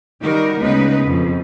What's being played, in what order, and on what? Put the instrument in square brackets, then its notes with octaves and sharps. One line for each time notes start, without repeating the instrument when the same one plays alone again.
[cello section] D#3 G3 D#4 F#4 A#4
D2 C#3 G#3 B3 D#4 B4
F2 B2